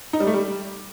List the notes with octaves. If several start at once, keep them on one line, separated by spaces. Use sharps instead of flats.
D#4
G3
A3
G3